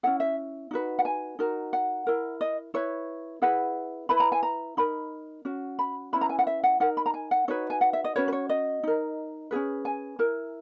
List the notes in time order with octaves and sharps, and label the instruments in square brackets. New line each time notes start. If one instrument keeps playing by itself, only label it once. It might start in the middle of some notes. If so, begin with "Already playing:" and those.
[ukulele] C#4 E4 G#4 F#5
E5
D#4 F#4 B4
F#5
G#5
D#4 F#4 A#4
F#5
E4 A#4
D#5
E4 B4 C#5
E4 G#4 B4 F#5
E4 B4 B5
A#5
G#5
A#5
D#4 A#4 B5
C#4 F#4
B5
C#4 E4 B4 B5
A#5
G#5
F#5
E5
F#5
D#4 A#4 F#5
B5
A#5
G#5
F#5
D#4 F#4 B4 C#5
G#5
F#5
E5
D#5
C#4 F#4 B4 C#5
B4
C#5
D#5
D#4 A#4
C#4 E4 G#4 B4
G#5
E4 A#4